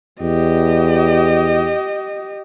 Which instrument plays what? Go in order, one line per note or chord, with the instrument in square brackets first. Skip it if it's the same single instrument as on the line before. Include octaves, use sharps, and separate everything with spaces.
[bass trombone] E2 [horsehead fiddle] G4 D#5